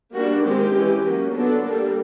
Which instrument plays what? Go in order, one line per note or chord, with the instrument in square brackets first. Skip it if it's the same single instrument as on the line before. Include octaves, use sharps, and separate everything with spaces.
[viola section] G3 A#3 D4 F#4
D#3 G#3 C4 G4
E3 G#3 C#4
F#3 A#3 C#4
D3 F#3 B3 D4 A4
G3 A#3 D4